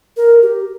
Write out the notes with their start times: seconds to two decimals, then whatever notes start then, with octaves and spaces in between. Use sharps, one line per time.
0.17 A#4
0.43 G4